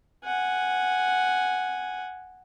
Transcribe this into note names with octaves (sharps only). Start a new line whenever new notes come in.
F#5 G#5